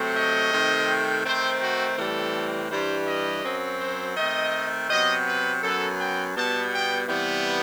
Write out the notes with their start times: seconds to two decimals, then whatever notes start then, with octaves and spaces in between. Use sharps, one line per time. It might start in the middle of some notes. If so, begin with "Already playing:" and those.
Already playing: C3 F#3 A3 C4
0.15 D#5
0.52 C3 D#3 A3 C4
1.24 D#3 A3 C4 C5
1.61 F#4
1.97 A2 E3 G3 C4 A4
2.71 G2 E3 G3 C5
3.07 D#5
3.43 F#2 F#3 C4
3.80 C5
4.16 D#3 A3 C4 D#5
4.89 C3 F#3 B3 D#5
5.26 B4
5.62 F#2 F#3 B3 A4
5.99 G5
6.36 B2 G3 B3 A5
6.72 G5
7.09 C3 E3 G3 B3